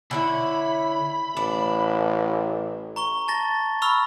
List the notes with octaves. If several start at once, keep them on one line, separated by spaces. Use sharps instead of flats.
D3 C#4 E4 B5
A1 D4
A#5 C#6 G7
A5 A6 A#6
B5 C#6 E6 F6 F7